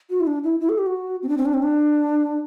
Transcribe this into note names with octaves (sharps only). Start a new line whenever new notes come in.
F#4
E4
D4
E4
E4
A4
G4
F#4
C4
D4
C4
D4
C4
D4